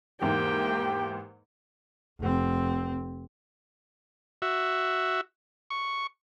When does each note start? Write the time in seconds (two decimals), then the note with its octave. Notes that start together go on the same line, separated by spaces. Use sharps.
0.22 E2 G#2 E3 A#3 G4 G5
2.20 F1 C4
4.42 F#4 E5
5.70 C#6